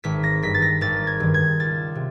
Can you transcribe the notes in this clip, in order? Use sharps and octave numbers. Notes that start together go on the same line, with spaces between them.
G#1 B6
A#6
G2 D#3 B6
A6
A#6
G#1 A6
G#6
G2 D#3
G#6
C#2 A6
C3